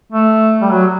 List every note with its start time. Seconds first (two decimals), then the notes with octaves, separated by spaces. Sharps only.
0.12 A3
0.62 G3
0.71 F#3